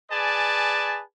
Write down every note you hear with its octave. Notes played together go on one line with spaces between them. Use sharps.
G#4 B4 D5 G#5 A5